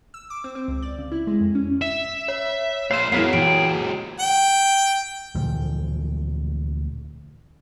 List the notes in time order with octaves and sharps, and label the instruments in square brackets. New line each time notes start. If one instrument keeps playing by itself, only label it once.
[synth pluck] E6
D6
C4
C4
C#2
D5
C#3
E4
G#3
F2
C#4
[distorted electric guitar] E5
[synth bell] C#5
[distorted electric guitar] A#2 C5 [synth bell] C#5 E7 [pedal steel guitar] F5
[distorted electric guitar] F#3 G#3 [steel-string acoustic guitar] B3 E4 [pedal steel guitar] A#4 B4 F5
[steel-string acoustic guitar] A#2 E3 [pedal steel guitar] G#4 G5
[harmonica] G5
[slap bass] D2 A#2 E3 F3